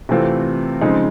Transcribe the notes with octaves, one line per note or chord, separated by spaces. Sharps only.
C3 E3 A3 C4 F4
C#3 F3 G#3 C4 D#4